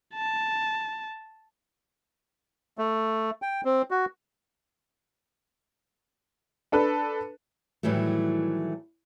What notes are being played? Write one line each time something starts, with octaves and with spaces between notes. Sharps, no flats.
A5
A3
G5
C4
F#4
D4 A4 B4
A2 D#3 E3 F#3 G3 A3